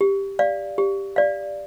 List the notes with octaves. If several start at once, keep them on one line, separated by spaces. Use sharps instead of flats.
G4
D5 F5
G4
D5 F5